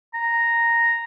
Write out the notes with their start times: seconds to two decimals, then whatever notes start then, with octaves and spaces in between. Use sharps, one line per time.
0.14 A#5